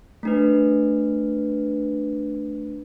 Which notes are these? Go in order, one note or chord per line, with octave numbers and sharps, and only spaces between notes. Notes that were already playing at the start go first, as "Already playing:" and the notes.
A3 D4 B4